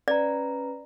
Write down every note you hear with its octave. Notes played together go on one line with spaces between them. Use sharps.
C#4 B4 D5 A#5